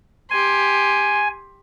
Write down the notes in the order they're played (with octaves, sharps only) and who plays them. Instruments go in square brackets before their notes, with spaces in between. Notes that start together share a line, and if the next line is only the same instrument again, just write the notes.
[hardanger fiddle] G4 C6 [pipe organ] G#5